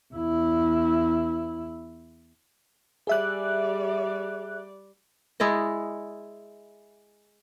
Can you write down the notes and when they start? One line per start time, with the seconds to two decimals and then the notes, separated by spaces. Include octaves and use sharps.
0.14 E2 E4
3.07 G3 G#4 D5 E5 F#6
5.40 G#3 E4 D5 D#5